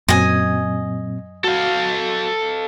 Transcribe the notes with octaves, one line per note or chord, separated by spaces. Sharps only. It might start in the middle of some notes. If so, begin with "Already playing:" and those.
F#2 A#2 F#3 C4 D#5 G#5
F#4 A4 F5